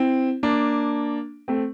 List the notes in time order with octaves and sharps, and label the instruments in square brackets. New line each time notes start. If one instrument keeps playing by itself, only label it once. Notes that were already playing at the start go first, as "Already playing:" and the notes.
Already playing: [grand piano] C4 E4
A#3 D4
A3 C4